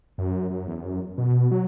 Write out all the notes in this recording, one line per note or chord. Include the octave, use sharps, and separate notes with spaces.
F#2
F#2
E2
F#2
B2
F#3